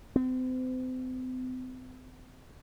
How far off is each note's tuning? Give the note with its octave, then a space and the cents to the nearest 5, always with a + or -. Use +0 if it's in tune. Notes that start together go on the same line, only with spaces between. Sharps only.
C4 -40